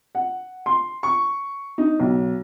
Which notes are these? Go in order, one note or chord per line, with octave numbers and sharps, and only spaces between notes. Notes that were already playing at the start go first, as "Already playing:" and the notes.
F#5
C6
C#6
D#4
B1